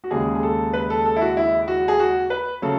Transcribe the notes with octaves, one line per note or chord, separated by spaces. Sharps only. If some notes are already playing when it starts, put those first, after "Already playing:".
F#4
D#2 C#3 G#3 G#4
G#4
A4
B4
A4
A4
E4
F#4
E4
F#4
G#4
F#4
B4
C#3 F#3 A3 A4